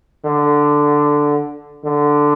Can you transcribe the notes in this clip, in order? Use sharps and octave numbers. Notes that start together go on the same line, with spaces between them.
D3
D3